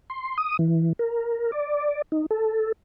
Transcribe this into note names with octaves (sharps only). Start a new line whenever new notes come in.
C6
D#6
E3
A#4
D5
D#4
A4